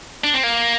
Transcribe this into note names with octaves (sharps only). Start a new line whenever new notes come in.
D4
C4
A#3